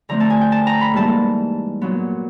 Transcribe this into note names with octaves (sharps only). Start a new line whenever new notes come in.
D3 F3 A3 C4 A#5
A5
G#5
G5
A5
A#5
B5
G#2 E3 G3 A#3 A5
A#2 F#3 B3